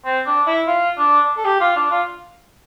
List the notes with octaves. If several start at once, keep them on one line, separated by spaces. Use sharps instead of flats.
C4
D4
E4
F4
D4
A4
G4
F4
D4
F4